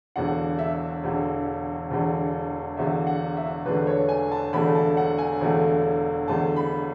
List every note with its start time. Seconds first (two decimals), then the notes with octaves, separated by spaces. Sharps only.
0.16 E1 E2 D3 F#5
0.59 E5
1.04 E1 E2 D3
1.90 E1 E2 D3
2.77 E1 E2 D3 E5
3.07 F#5
3.37 E5
3.66 E1 E2 D3 A3 B4
3.87 C#5
4.09 G#5
4.32 A5
4.53 E1 E2 D3 A3 B5
4.75 A5
4.97 F#5
5.18 G#5
5.41 E1 E2 D3 A3
6.28 E1 E2 D3 A3 A5
6.56 B5